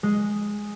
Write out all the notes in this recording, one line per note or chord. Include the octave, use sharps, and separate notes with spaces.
G#3